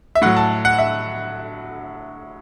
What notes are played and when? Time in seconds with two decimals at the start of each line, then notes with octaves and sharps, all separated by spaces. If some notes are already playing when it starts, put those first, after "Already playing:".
0.15 E5
0.22 A2 F#3 F#5
0.37 A5
0.65 F#5
0.79 E5